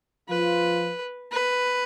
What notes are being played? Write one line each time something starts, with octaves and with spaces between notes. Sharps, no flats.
F3 F4 B4
B4